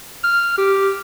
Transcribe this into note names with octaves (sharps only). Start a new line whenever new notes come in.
F6
G4